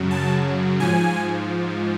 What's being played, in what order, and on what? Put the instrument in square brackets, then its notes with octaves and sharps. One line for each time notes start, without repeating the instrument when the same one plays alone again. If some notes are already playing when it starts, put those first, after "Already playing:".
Already playing: [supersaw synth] F#2 C#3 F#3
A5
G#2 F3 G#5